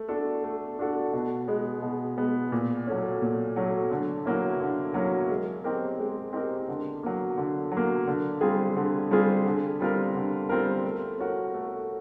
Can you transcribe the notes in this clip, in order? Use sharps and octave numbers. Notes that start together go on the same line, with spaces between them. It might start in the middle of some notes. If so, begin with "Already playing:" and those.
Already playing: A3
D4 F#4 A4
A3
D4 F#4 A4
B2
G#3 B3
B2
G#3 B3
A#2
F#3 A3 C#4
A#2
F#3 A3 C#4
D3
F#3 A#3 C#4 E4
D3
F#3 A#3 C#4 E4
G#3
C4 D#4 G4 A#4
G#3
C4 D#4 G4 A#4
D3
F#3 A#3
D3
F#3
A#3
D3
G3 C4 F4 G#4
D3
G3 C4 F4 G#4
D3
G3 C4 F4 A#4
D3
G3 C4 F4 A#4
A3
C#4 F#4 A#4
A3